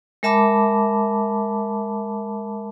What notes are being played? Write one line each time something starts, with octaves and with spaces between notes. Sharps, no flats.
G#3 A#4 E5 A5 B5 D6